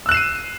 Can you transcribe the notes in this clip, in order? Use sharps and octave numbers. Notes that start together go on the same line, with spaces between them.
E6 F#6 C7 D#7 E7